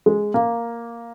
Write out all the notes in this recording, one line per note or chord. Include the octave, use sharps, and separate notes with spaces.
G#3
A#3